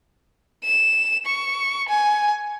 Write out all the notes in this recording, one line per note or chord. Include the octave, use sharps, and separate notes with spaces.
E7
C#6
G#5